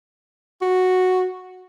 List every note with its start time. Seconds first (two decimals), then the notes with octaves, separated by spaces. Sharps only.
0.62 F#4